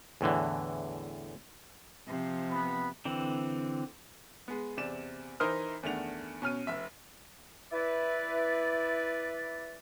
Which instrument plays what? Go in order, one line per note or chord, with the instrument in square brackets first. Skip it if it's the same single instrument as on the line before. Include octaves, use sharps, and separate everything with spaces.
[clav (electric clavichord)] E2 A2 D3 E3
[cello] C3 F3
[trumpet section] B3 B5
[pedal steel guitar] D3 E3 C4
[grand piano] G#3 B3
E2 C3 D5 E7
E3 D#4 A#4 C5 D#6 F6
E2 D#3 A3 D4 F#5 F7
B2 C#4 F6 D#7
F1 E5
[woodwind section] E4 B4 D5